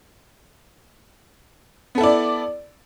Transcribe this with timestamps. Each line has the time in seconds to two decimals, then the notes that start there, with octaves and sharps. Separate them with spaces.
1.95 B3
1.98 A4
2.01 E4
2.03 D5